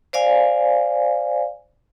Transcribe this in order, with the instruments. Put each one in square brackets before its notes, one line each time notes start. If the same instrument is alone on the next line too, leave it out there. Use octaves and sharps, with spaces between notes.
[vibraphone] C5 D5 F5 G#5